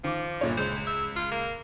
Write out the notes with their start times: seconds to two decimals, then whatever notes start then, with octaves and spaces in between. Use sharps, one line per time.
0.04 D#3 F3 D6
0.41 G1 A#2 C#5
0.57 C#2 C5
0.87 E5
1.16 F4
1.31 A#3